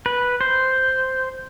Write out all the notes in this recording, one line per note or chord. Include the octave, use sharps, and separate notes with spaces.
B4
C5